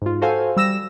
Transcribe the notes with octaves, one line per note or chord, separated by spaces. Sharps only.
G#2 F4
F#4 A4 C5 F5 G#5
G3 E6 A#6 E7